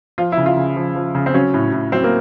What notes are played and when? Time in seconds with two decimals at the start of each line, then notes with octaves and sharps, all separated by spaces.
0.18 F3 F4
0.32 E4
0.37 C#3
0.46 F4
0.57 C#3
0.76 F3
0.95 F3
1.15 C#3
1.26 C4
1.34 F#3 C#4
1.54 A2
1.72 A2
1.92 F#3 C4
2.04 A#3